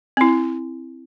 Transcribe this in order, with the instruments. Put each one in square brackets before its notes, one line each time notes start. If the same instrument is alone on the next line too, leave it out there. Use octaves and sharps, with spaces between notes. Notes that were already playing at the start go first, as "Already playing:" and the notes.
[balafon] C4 E4